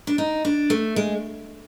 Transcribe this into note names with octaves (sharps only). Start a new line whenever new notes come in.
D4
D#4
D4
A3
G#3